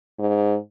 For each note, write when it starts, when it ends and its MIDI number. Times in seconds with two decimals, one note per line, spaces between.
0.19 0.56 44